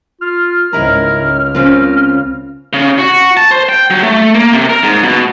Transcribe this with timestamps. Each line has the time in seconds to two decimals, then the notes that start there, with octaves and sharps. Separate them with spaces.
0.21 F4 F6
0.73 C#2 G#2 E4 A#4 A#5
1.55 C#3 C4 F4 A#4
2.73 C#3
2.99 F#4
3.37 A5
3.51 C5
3.69 G5
3.90 F#3
4.03 A3
4.35 A#3
4.53 C3
4.69 A#4
4.82 G#2
5.03 B2